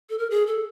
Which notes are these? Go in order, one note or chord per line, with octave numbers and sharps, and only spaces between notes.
A4
A#4
G#4
A4